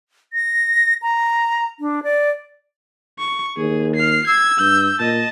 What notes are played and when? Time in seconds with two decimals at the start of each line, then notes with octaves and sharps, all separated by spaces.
0.33 A#6
1.02 A#5
1.80 D4
2.03 D5
3.19 C#6
3.57 D#2 G#4
3.96 F6 C7
4.27 E6 G#6
4.59 G2 G6
4.99 A#2 D#5 A5